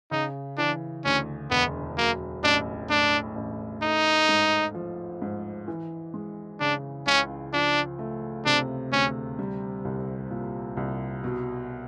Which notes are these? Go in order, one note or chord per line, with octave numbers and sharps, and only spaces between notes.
C#3 D#4
E3 D4
D2 C#4
E1 B3
F#3 A#3
A1 D4
A2 D4
A1
A3 D#4
G#2
F3
G#2
E3
G#3
C#3 D4
C#2 C#4
F3 D4
A3
C3 D4
D2 C#4
G3
C2
A#2
C2
B2